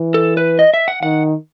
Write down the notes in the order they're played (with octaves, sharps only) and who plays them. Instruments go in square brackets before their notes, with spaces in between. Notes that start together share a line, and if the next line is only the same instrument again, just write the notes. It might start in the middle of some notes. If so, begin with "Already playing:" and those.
Already playing: [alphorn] E3
[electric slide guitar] A4
B4
D#5
E5
F#5
[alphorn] D#3 [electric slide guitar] F#5